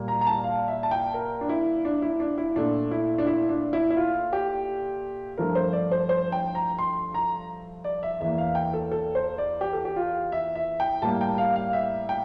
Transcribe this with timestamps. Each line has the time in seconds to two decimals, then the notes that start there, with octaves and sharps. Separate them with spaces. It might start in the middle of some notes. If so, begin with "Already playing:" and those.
Already playing: A#2 G3 A#3
0.08 A#5
0.21 A#5
0.27 A5
0.44 F5
0.68 E5
0.83 A5
0.91 G5
1.14 A#4
1.41 D4
1.49 E4
1.85 D4
2.02 E4
2.20 D4
2.38 E4
2.56 A#2 A3 D4
2.91 E4
3.18 D4
3.27 E4
3.49 D4
3.73 E4
3.90 E4
3.97 F4
4.33 G4
5.38 G2 F3 A3 A#4
5.55 C5
5.73 D5
5.91 C5
6.09 C5
6.32 G5
6.55 A#5
6.79 C6
7.14 A#5
7.84 D5
8.03 E5
8.20 E2 E3 A#3 E5
8.38 F5
8.55 G5
8.74 A4
8.91 A4
9.15 C5
9.38 D5
9.61 G4
9.73 A4
9.85 G4
9.96 F4
10.32 E5
10.55 E5
10.80 G5
11.02 A2 G3 A#3 A5
11.21 G5
11.38 F5
11.56 F5
11.73 E5
12.09 G5